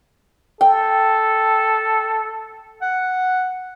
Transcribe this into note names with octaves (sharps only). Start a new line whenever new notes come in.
A4 G5
F#5